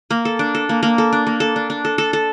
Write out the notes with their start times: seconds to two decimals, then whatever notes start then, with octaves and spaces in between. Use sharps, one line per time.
0.10 A#3
0.25 A4
0.39 D4
0.55 A4
0.69 A#3
0.83 A#3
0.98 A4
1.13 D4
1.27 A#3
1.40 A4
1.56 D4
1.70 D4
1.85 A4
1.98 A4
2.13 A4